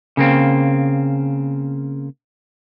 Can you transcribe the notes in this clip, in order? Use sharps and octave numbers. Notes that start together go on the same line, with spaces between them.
C#3 A#3 C4